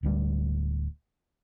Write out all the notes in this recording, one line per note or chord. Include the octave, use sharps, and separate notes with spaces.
D1 D2 G3